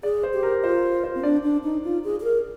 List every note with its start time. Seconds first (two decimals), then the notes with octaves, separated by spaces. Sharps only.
0.03 G#4 D5
0.23 C5
0.34 G4
0.43 A#4
0.64 F4 C5
1.04 C5
1.15 C4
1.23 D4 D5
1.43 D4
1.64 D#4
1.84 F4
2.04 G#4
2.20 G#4
2.24 A#4